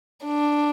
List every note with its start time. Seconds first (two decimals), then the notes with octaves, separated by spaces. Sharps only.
0.25 D4